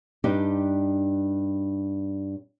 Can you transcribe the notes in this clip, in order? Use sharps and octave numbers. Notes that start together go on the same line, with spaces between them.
G2 D4 D#4 G4